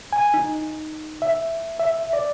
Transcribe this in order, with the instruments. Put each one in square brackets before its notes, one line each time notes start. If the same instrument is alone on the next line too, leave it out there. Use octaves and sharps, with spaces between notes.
[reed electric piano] G#5
D#4
E5
E5
D5